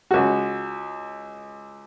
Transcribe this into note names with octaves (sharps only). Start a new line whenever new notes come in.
C#2 F#4